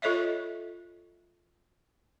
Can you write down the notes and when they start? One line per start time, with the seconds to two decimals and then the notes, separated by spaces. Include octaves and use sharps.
0.02 F4 A4 C#5 D#5 E5